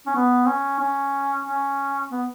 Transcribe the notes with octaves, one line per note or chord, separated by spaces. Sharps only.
C#4
B3
C#4
C#4
C#4
B3